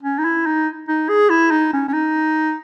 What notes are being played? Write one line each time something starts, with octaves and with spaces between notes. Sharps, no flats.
C#4
D#4
E4
D#4
D#4
G#4
E4
D#4
C#4
C#4
D#4